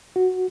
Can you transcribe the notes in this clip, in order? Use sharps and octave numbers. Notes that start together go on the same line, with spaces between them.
F#4